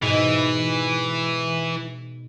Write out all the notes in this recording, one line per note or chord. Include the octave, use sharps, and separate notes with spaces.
G#2 B2 E3